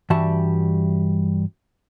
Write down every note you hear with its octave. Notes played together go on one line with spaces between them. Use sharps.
G2 E3 G3 F#4 E5 A5